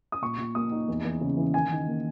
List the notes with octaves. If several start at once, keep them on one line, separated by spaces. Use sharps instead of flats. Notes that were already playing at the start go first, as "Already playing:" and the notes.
D#6
A#2 C#6
A#2
A#3 D#6
D#4
E2
E2
C#3
E3
D#3 G#5
D#3
A#3